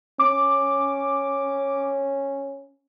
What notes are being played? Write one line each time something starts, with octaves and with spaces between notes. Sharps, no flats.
C#4 D6